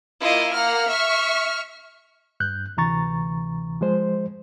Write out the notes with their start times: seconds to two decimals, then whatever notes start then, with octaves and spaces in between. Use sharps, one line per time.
0.21 A#3 E4 F4 D#5
0.54 A#3 F#5 F6
0.88 E5 C#6
2.40 G2 F#6 G6
2.77 D2 C3 E3 A#5 C#6 A6
3.81 F3 G#3 C5